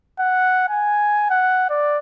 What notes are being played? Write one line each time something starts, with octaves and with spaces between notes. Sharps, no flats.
F#5
G#5
F#5
D5